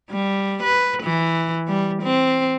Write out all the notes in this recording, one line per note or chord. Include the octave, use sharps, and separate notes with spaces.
G3
B4
E3
G3
C4